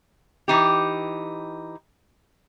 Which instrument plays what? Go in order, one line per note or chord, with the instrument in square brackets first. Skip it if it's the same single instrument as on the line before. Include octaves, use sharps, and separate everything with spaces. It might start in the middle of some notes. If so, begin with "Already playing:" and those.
[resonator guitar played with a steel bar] E3 D#4 G4